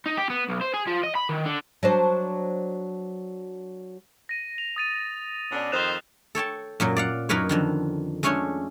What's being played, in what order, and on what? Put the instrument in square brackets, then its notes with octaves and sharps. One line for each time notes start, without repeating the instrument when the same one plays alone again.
[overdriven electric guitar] D#4
G4
B3
B1
C5
G#4
F3
D#5
B5
D#3
D3
[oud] F#3 D4 C5
[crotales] A#6 D#7
F7
D#6 A6 D#7
[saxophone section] B2 C#4 D4
[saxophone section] F2 D#3 C5 [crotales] F#6 E7 F7
[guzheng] A4 C#5 G5 A5
F#2 A#2 F#3
D5 F5 F#5
F#2 D#4 A#4 B4 C#5
F2 D3 D#3
G#3 A3 C#4 D4 C#5